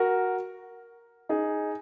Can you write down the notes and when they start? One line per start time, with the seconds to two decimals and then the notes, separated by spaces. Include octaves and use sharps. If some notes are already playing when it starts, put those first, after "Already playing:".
Already playing: F#4 A#4
1.29 D#4 G#4